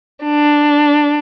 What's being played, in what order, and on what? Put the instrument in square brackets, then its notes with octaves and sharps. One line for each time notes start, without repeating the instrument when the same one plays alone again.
[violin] D4